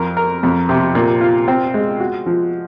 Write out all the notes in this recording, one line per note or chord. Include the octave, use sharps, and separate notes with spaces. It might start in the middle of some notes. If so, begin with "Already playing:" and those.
Already playing: F2 A#4
A#4
F2
C3
A#2
F4
C4
G#3
F#4
F3